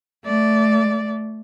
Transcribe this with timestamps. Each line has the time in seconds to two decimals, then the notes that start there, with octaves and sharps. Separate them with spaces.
0.24 A3 D5